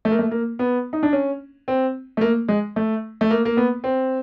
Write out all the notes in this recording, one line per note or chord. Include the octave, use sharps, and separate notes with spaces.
A3
A#3
A3
A#3
B3
D#4
D4
C#4
C4
A3
A#3
G#3
A3
A3
A#3
A#3
B3
C4